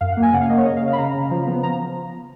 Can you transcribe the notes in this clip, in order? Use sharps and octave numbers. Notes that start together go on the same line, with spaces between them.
F#2 F5
F#5
A#3
G#5
C#3 F#5
F5
A#3 D#5
C#5
C#3 D#5
F5
C#3
F5
B5
C#3 A#5
C#3
F3
B3
F3 A#5